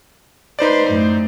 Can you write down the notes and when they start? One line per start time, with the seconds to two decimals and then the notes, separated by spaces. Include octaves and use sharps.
0.59 D#4 B4 C5 D5 C6
0.87 F#2 A2